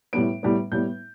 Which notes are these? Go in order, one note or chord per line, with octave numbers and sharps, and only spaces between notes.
A2 G3 B3 D7
A2 G3 B3
A2 G3 B3 G6